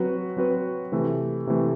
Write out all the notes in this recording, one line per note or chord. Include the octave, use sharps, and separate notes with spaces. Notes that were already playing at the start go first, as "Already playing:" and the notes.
Already playing: F#3 C4 F#4 B4
F#3 C4 F#4 B4
C3 E3 A3
C3 E3 A3